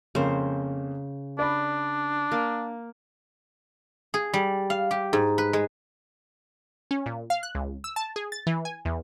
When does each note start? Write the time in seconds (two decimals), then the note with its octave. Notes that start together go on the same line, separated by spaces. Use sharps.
0.15 F2 C#3 A#3 C5
1.39 D4 D5 B5
2.32 A#3
4.14 G#4
4.33 G3
4.70 F5
4.91 G4
5.13 G#2
5.38 B4
5.53 G#3
6.91 C#4
7.06 A#2
7.30 F5
7.43 F#6
7.55 C#2
7.84 E6
7.96 A5
8.16 G#4
8.32 A6
8.47 E3
8.65 G#5
8.85 E2